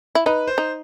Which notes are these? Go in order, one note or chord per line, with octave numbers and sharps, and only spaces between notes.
E4
D#4 B4
C5
D#4